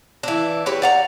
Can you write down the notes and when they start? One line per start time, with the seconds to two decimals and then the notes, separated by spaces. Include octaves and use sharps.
0.23 E3 D4
0.66 G4 B4 C#5
0.82 D5 F#5 A#5